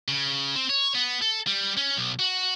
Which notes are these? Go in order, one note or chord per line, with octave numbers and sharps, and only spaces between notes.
C#3
C4
C#5
B3
A4
G3
C#4
B1
F#4